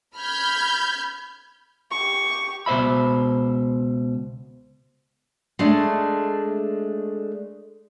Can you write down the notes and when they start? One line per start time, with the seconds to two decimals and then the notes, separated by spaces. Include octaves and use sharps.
0.17 B5 F6 G6 G#6
1.91 G4 C#6
2.66 C#2 B2 C5 E5 B5
5.59 G#3 A3 D4